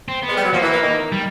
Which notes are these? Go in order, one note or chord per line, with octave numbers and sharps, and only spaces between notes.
C4
B3
G#3
G3
F#3
F3 A#3
E3
E3
D#3
G3